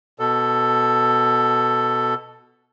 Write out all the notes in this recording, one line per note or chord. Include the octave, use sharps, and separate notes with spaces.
B2 A4